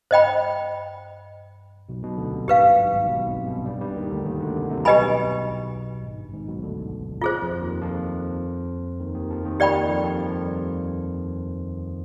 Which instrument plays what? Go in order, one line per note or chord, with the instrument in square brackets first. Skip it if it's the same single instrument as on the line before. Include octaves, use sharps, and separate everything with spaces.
[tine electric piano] G2 [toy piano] C5 D#5 G5 B5
[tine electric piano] B1 B2
B1 B2
D2 D3
C2 C3
[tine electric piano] G#1 G#2 [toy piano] G4 B4 F5
[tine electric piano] G2
B1 B2
G#1 G#2
B1 B2
C2 C3
B1 B2
G2 G3
G2 G3
D#2 D#3
D2 D3
D#2 D#3
D2 D3
C2 C3
C2 C3
[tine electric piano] B1 B2 [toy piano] G4 B4 D#5 G#5 B5
[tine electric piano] G#1 G#2
G2
G#1 G#2
B1 B2
D2 D3
[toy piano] F4 G#4 C5
[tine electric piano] F2 F3
D#2 D#3
F2 F3
D#2 D#3
D#2 D#3
F2 F3
D#2 D#3
[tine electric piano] D#2 D#3 [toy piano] G4 D5 G5 B5
[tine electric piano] F2 F3
F2 F3
F2 F3
G3